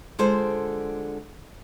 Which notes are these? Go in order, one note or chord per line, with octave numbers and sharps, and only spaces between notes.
D3 G#3 F4 A4 C5